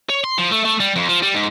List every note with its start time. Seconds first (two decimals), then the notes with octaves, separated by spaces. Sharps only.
0.10 C#5
0.24 C6
0.38 F3
0.51 A3
0.65 A3
0.80 G3
0.96 F2
1.09 F3
1.23 G3
1.34 G#2